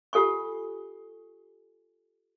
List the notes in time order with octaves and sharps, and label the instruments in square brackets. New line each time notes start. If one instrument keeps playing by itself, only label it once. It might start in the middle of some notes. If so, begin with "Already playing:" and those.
[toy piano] F4 G4 A4 G#5 C#6